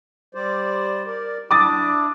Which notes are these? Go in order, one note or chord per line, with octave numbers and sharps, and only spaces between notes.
G3 C5 D5
A#4 D5
D4 E4 D6 D#6 A6